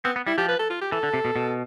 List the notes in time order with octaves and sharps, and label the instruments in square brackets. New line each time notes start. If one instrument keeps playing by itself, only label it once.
[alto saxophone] B3 [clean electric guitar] C4
[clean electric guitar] B3
[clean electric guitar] G3 [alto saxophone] E4
[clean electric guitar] F3 [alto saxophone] G4
[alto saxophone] B4
A4
F4
G4
[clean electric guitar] E3 [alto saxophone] A4
[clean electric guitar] D3
C3
B2
B2